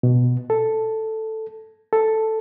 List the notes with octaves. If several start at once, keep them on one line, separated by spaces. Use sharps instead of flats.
B2
A4
A4